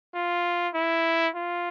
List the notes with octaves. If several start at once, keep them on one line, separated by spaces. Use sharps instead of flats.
F4
E4
F4